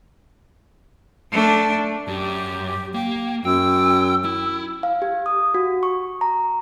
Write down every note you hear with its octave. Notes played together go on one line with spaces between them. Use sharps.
A3 D4
F#2 G4
A#3 G5
F#2 G5 E6
E4 E6
F5
G4
D#6
F#4
C#6
A#5